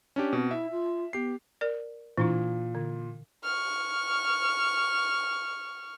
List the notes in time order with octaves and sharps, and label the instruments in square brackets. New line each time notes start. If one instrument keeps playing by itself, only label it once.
[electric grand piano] C#4 D4 G4
[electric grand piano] B2 [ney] C4
[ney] E4 [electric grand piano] E5
[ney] F4
[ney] B3 [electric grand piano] G4 C7
[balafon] A#4 D5
[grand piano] A#2 [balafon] E3 D4 E4
[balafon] D3
[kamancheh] C#6 F6